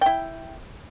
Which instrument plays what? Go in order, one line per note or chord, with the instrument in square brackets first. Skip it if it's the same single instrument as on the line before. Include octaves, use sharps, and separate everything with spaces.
[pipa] E4 G5